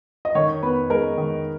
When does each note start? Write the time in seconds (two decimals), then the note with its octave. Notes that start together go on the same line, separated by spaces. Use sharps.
0.25 D#5
0.35 D#3 C#5
0.63 B3 B4
0.90 G#3 A#4
1.18 D#3